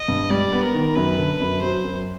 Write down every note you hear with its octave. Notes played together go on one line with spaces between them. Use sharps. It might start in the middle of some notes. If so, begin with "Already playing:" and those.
Already playing: D#5
G2
G3 D5
B3
A#4
D#3
F#2 B4
D3
F#2
F#3 C5
F#2